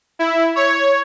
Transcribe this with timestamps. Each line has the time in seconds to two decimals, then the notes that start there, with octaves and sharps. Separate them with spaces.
0.19 E4
0.56 C#5